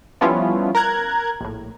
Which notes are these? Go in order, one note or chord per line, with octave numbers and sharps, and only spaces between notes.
F3 G3 B3 C#4 E4 F4
A#4 A#5 F#6 G#6
A#1 A2